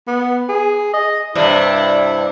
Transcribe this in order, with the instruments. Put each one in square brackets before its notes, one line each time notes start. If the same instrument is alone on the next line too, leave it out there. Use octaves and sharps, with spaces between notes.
[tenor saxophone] B3
G#4
D#5
[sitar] G2 C3 D4 [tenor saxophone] E4